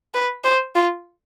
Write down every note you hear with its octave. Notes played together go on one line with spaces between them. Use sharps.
B4
C5
F4